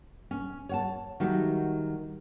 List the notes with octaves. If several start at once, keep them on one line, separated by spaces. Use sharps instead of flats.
C#4
C#5 F#5 A5
D#3 F#3 G3 A3 D#4 F#4